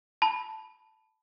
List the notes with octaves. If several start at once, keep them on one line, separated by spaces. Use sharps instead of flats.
A5 B5